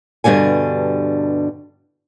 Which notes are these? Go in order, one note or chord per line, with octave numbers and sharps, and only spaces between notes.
G2 B2 D3 G3 G#5